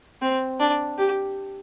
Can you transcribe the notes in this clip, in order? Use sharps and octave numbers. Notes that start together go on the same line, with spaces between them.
C4
D4
G4